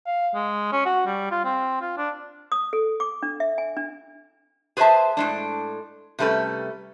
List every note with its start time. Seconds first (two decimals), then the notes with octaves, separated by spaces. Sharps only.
0.07 F5
0.35 G#3
0.72 C#4
0.86 F#4
1.06 G3
1.31 F4
1.45 C4
1.82 F4
1.98 D4
2.52 D#6
2.73 A4
3.00 D6
3.23 D4
3.40 E5
3.58 G#5
3.77 D4
4.77 G#4 B4 C5 D5 E5 A5
5.17 A2 G#3 D4
6.19 C3 G3 A3 C#4 B4